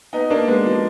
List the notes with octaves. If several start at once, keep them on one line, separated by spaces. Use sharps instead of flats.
B3 D#4
A#3 D4
G#3 B3
F3 G#3